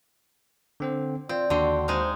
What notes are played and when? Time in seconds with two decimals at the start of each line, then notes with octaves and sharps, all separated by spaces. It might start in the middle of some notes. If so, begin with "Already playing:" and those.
0.80 D3 C4 C5
1.29 C4 F4 D5
1.50 D#2 D3 C4 F#4 C6
1.88 G#3 D#4 C5 F5